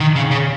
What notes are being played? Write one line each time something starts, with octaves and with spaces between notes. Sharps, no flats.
D#3
C#3
C#3